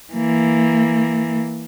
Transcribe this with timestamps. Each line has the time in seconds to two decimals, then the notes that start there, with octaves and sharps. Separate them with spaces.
0.13 E3 A#3